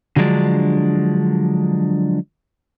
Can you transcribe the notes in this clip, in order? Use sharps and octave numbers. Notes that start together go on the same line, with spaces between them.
D3 F3 F#3 G#3 D4